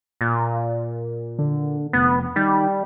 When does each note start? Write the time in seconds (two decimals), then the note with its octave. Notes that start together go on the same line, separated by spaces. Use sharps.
0.21 A#2
1.39 D3
1.93 F1 B3
2.36 D#3 G3